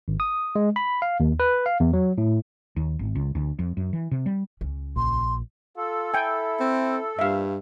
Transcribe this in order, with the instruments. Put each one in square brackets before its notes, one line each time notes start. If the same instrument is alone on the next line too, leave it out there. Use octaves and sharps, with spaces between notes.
[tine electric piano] G#1
D#6
G#3
B5
F5
D#2
B4
F5
E2
F#3
A2
[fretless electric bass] D#2
G#1
C#2
D2
F2
F#2
E3
C3
G3
[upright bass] C#2 C#4
[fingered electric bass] A#1 [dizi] C6
[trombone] F4 [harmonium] A4
[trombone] E4 [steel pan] G5 G#5
[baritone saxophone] C4
[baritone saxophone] G2 [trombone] A#2 [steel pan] E5 F5